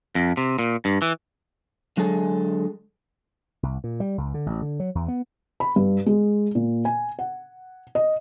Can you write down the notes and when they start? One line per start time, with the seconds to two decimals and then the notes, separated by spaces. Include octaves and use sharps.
0.15 F2
0.37 C3
0.59 A#2
0.85 G2
1.02 E3
1.97 D3 F#3 G#3 G#4 A4
3.63 C2
3.84 A#2
4.00 G3
4.18 C#2
4.34 D3
4.46 A1
4.62 D3
4.80 F#3
4.95 E2
5.08 B3
5.60 B5
5.76 G2
6.06 G#3
6.55 A#2
6.85 G#5
7.19 F#5
7.95 D#5